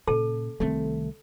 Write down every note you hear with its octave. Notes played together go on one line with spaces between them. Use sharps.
A#2 C#3 A4 A5
C2 D#3 A3 C4